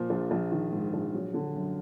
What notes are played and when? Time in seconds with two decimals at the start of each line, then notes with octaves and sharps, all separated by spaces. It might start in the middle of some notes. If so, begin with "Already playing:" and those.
Already playing: A#2 F3 A#3
0.10 A#1
0.31 A#1
0.52 D#3
0.72 G#2
0.94 A#1
1.14 F#3
1.34 D3
1.55 F#2